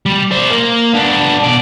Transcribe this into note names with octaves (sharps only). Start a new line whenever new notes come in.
G3
C5 D5
A#3
B3 D4
B2 D5